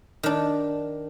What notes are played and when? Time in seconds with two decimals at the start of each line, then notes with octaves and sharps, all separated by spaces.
0.23 D#3 D4